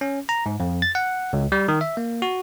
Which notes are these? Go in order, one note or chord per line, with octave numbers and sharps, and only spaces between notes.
C#4
A#5
G#2
F2
A6
F#5
C#2
G3
D#3
E5
A#3
F#4